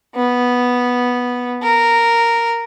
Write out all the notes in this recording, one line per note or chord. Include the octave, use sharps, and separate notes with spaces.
B3
A#4